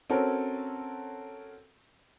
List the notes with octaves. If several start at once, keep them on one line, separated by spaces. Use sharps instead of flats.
C4 C#4 F#4 A4 A#4 C#5